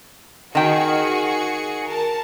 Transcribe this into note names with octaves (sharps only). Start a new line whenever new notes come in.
D#3 F#4 G#4 G5 C#7
A#4 A5